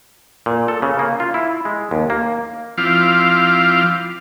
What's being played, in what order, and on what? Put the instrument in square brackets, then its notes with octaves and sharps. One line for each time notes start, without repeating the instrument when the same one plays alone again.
[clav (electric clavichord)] A#2
A4
C#3
A#3
F4
E4
G#3
D#2
A#3
[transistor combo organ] F3 C4 E4 F4 F5 D6